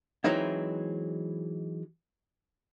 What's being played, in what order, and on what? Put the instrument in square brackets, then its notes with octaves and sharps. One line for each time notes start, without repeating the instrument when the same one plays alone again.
[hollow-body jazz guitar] E3 F#3 G#3 C4 D#4 E4